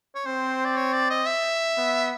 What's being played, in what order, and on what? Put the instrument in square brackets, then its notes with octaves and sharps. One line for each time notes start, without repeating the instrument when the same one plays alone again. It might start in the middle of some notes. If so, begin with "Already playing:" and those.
[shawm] C#5
[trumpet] C4 [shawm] C5
[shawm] D5
C#5
D5
D#5
E5
[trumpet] B3